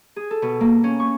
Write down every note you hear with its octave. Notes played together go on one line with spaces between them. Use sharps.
G#4
A4
B2
A#3
C#4
C#6